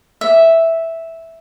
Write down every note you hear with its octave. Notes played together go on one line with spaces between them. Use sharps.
E5